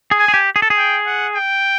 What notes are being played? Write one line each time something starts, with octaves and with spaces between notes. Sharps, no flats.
G#4
G#5
G#4
G4
G#4
A4
G#4
G5
F#5
G5